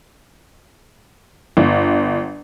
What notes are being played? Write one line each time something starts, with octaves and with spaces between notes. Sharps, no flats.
G1